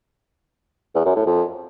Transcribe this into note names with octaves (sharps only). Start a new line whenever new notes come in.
E2
F#2
A2
F2